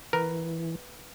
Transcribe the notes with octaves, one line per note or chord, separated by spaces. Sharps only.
E3 A#4 B4